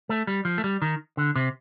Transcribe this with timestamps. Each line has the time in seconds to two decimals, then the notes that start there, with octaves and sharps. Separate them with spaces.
0.09 A3
0.27 G3
0.45 F3
0.58 A3
0.64 G3
0.82 D#3
1.17 D3
1.35 C3